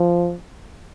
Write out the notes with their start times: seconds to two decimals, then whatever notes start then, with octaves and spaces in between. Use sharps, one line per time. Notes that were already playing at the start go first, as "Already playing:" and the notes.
Already playing: F3